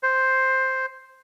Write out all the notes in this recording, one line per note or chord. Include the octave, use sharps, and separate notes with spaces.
C5